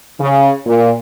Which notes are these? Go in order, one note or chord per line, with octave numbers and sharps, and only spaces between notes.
C#3
A#2